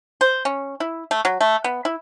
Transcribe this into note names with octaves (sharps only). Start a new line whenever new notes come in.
C5
C#4
E4
A3
F#3
A3
B3
E4